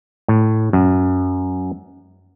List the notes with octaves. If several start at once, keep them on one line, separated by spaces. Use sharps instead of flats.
A2
F#2